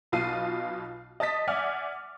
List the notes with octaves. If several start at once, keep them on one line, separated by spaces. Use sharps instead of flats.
B1 B2 F4 A5 C7 D#7
D#5 A5 D#6 A6 B6
D5 E5 F#5 G#5 D6 F6